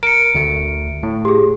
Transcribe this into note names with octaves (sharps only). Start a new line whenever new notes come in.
A#4 C#7 D7
D2 A3
A2
G4 G#4